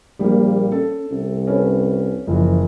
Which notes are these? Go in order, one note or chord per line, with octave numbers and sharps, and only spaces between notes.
A#1 G3 A#3
C#4 A4
C2
C#4 A4 B4
F#1 E3 F3